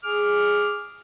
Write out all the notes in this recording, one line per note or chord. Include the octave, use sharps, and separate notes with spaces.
G#4 D6 F6